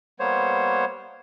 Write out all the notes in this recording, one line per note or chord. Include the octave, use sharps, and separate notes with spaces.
G3 A#3 B3 C5 C#5